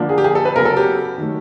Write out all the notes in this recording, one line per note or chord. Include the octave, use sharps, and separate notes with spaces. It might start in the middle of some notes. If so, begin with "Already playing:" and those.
Already playing: D3 F3 A#3 D4
G#4
G4
G#4
A4
B4
C#3 F#3 B3 A#4
A4
G4
D#3 F#3 A3